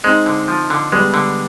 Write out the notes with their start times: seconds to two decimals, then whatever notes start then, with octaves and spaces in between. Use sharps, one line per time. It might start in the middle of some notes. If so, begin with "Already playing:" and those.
0.04 G#3 C4 D#4
0.26 D3
0.48 F3
0.70 D3
0.92 G3 G#3 B3
1.14 D3